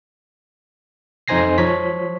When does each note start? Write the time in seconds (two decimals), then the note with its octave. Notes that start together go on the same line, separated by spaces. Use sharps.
1.28 F2 D#4 C5 G#5 A#6 C7
1.58 F3 C#5 B6